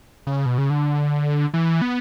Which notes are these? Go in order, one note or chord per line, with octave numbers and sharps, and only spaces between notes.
C#3
B2
C#3
D3
E3
B3